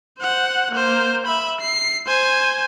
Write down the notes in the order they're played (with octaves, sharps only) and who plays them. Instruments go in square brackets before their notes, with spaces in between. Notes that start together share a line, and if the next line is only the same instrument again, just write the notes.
[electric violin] C5 F#5
A#3 C5
E5 B5
C7
C5 G#5